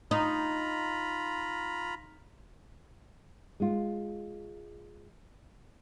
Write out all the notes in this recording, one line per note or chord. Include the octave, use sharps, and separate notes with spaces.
D#4 F4 A#5 B5
G#3 F4